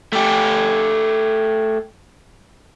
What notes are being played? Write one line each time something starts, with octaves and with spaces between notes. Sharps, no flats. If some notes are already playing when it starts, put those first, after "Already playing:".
A3 G4